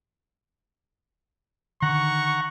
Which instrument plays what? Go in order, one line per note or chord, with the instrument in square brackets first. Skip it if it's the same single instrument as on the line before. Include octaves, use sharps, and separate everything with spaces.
[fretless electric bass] D3 D#3 [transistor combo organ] F#5 A#5 [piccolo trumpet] C#6